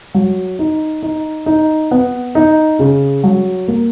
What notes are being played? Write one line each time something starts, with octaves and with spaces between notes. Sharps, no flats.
F#3
D#4
D#4
D#4
B3
D#4
C#3
F#3
A#3